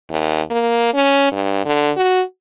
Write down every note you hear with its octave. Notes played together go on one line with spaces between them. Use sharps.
D#2
A#3
C#4
G2
D3
F#4